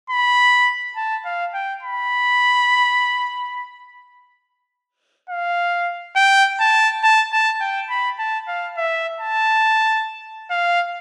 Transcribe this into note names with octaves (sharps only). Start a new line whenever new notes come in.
B5
A5
F5
G5
B5
F5
G5
A5
A5
A5
G5
B5
A5
F5
E5
A5
F5